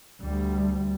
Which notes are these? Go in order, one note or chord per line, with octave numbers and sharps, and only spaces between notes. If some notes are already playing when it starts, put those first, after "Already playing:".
D2 G3